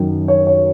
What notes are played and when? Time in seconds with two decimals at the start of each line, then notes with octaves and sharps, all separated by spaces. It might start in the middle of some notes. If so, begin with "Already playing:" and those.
Already playing: F#2 D#3 F#3
0.28 C#5
0.47 C#5